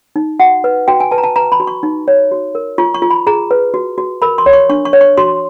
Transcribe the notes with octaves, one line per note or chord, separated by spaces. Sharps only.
D#4
F#4 F#5
B4
F#4 G5
G#5
B4 A5
A#5
A5
B4 A#5
B5
F#4
C#6
D#4
C#5
F#4
A#4
F4 C#6
C#6
F4
B5
G#4 A#5
B4
F#4
F#4
A#4 B5
C6
C#5
C#6
D4 C#6
C#6
C#5
C#6
F#4 C6